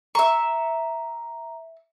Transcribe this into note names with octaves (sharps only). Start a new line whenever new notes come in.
E5 A#5 C#6